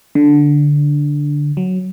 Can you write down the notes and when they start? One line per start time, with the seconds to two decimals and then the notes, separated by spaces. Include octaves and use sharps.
0.15 D3
1.57 F#3